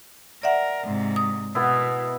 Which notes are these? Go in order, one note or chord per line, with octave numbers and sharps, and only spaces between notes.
A#4 D5 E5 F#5
G#2 C3
D#6
B2 B3 E4